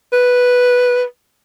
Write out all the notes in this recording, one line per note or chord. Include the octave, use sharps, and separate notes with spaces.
B4